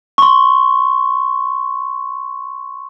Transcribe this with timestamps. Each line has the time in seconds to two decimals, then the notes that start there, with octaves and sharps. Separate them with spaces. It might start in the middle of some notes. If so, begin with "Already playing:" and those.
0.18 C6 C#6